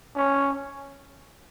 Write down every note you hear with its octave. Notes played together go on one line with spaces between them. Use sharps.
C#4